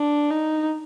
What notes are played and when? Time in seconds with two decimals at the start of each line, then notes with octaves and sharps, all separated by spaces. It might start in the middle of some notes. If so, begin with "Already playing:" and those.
Already playing: D4
0.30 D#4